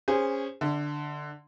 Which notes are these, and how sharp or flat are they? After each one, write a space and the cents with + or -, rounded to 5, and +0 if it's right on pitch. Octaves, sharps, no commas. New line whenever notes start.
C#4 +0 G#4 -20 C5 -5
D3 +5 E5 -30